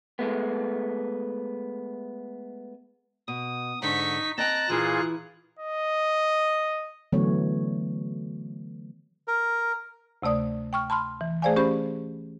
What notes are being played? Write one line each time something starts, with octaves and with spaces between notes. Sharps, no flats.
G#3 A3 B3
B2 D#6
G#2 D3 D#4 C#6 B6
C4 D#5 G5 A5 A#5 F#6 A#6
A#2 E3 E4 F4 G#4
D#5
D3 E3 F#3 A3 B3 C#5
A#4
D2 C3 A3 D5 D#6
G5 C#6 F6
A5 B5 C6 F6
E3
A3 G#4 C5 D5 F5 G#5
C#4 G4 C5 B5